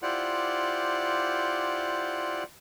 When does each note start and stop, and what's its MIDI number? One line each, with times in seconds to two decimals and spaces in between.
0.02 2.44 64
0.02 2.44 65
0.02 2.44 67
0.02 2.44 72
0.02 2.44 74
0.02 2.44 78